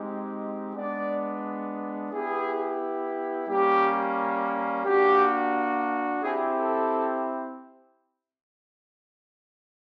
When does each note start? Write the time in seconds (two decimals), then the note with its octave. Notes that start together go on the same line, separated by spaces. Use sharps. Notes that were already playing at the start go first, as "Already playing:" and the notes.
Already playing: G#3 C4 D#4 G4
0.76 G#3 B3 D4 D5
2.12 B3 E4 G4 G#4
3.49 G3 A#3 C#4 G4
4.85 A#3 D4 F#4 G4
6.22 C4 E4 G4 G#4
6.57 A4